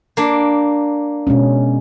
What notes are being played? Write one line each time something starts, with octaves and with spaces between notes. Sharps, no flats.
A#3 D4
B2 G#3 C#4